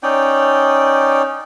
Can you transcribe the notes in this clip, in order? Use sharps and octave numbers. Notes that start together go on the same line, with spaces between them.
C#4 D#4 D5 G5